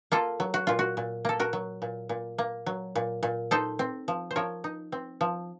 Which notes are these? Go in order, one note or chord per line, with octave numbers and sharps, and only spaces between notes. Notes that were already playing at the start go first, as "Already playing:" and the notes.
A#3 F4 A4
F#3
F#4
A#2 F4
F#4
A#2
A#3 A4
F#4 A#4
F#3
A#2
A#2
A#3
F#3
A#2
A#2
D#4 A4 C5
C4
F3
C5
F3 A#4 C#5
D#4
C4
F3